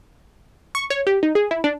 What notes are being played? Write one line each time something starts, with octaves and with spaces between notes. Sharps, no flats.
C#6
C#5
G4
D#4
G#4
E4
D4